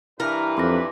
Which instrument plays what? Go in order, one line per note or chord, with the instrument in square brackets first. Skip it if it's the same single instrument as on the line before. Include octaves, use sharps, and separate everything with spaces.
[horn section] G2 E3 B4 [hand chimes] E4 A#5 [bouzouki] A#4
[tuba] F2 [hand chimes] C6 D6 A#6